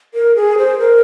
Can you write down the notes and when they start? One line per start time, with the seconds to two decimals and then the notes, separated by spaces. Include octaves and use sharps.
0.14 A#4
0.35 G#4
0.58 C5
0.79 A#4